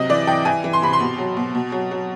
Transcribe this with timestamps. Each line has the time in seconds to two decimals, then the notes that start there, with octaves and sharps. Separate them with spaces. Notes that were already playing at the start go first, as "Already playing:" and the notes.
Already playing: C3 F#3 D#5
0.09 E3 D5
0.27 E3 G5
0.45 E3 G#5
0.64 E3
0.73 C6
0.82 C3 B5
0.93 C6
1.00 B2
1.18 F#3
1.37 B2
1.55 B2
1.72 F#3
1.91 F#3